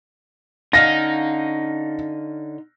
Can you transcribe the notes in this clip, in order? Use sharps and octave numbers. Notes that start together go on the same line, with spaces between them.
D3 C#4 D#4 F5 A#6